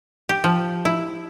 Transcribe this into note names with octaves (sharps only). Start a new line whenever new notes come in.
G4
F3
E4